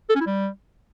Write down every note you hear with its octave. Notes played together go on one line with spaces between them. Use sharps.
A4
C#4
E4
G3